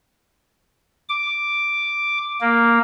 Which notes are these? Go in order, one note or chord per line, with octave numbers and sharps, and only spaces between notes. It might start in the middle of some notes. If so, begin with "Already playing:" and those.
D6
A#3